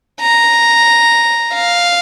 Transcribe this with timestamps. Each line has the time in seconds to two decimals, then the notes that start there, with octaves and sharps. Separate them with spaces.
0.21 A#5
1.55 F5